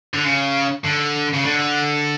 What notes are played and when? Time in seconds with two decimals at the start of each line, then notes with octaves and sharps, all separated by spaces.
0.14 D3
0.24 C#3
0.84 D3
1.33 C#3
1.45 D3